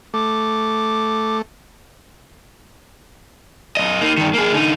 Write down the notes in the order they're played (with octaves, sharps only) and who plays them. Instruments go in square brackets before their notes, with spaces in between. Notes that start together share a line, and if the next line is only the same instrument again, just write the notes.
[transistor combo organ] A3 [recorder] D6
[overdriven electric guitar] F#2 D#5
A#3 D#4
G2 D#3
A#3 G#4
D3 D#4